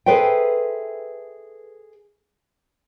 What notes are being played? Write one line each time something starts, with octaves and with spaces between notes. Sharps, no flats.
G#4 A4 B4 C5 E5 G5